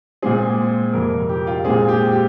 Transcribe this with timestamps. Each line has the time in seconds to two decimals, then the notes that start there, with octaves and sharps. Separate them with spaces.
0.22 A#2 G#3 C4 G#4
0.93 F2 C3 G3 A#4
1.29 G4
1.47 F4
1.65 A#2 G#3 C4 G#4
1.88 G4
2.12 G4